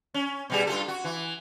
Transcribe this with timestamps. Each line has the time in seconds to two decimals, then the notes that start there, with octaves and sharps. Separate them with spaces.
0.14 C#4
0.50 B2 G3 G#4
0.67 G2 F4 A4
0.88 F#4
1.04 E3